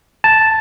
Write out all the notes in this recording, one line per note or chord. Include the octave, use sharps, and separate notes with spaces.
A5